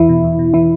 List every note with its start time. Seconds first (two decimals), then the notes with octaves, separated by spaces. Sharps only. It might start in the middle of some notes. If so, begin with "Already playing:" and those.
Already playing: E2 E3 E4
0.09 B2
0.24 E2
0.39 B2
0.54 E3 E4